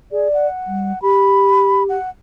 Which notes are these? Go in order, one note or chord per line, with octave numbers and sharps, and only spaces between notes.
G#4 D5
F#5
G3
G4 B5
F#5